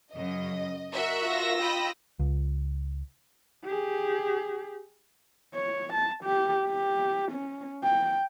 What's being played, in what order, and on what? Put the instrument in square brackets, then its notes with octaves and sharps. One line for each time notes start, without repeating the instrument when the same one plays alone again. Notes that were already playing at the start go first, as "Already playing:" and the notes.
[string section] F#2 C#3 [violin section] D#5
[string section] F#4 A#4 E5
[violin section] F4 E6 A#6
[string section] D#5 G5 B5
[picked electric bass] C#2
[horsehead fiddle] G4 G#4
C#5
A5
G4
G4
C#4
G5